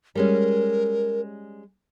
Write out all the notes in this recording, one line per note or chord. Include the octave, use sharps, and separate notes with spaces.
G3 G#3 C#4 A#4